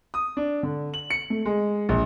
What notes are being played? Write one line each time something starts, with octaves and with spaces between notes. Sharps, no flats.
D#6
D4
D3
F#7
C#7
A3
G#3
A#1